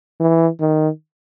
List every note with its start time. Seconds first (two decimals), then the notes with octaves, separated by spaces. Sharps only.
0.20 E3
0.61 D#3